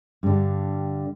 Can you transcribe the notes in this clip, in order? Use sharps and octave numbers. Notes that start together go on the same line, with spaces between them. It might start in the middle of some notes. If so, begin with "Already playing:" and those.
G2 D3